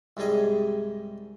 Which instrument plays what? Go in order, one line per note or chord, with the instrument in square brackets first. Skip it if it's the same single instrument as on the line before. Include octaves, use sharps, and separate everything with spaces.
[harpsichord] C2 G#2 G3 G#4 D#5